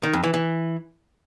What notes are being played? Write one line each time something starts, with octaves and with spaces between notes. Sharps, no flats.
D#3
F2
E3
E3